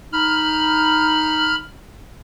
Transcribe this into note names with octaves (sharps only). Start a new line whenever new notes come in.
D#4 B5 F6